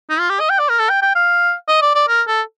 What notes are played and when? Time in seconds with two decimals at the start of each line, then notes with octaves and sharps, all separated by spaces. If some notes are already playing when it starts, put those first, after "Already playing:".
0.10 D#4
0.20 F4
0.30 G4
0.40 D#5
0.50 G5
0.59 D5
0.69 A#4
0.79 A4
0.89 G5
1.02 G5
1.15 F5
1.68 D#5
1.81 D5
1.95 D5
2.08 A#4
2.28 A4